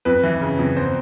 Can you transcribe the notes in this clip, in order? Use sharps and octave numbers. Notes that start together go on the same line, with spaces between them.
F2 B4
E3
C#3
F2
E2 C5